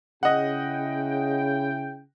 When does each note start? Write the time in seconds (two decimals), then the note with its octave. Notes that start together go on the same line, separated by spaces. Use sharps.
0.23 C#3 E4 D#5 F#5 G5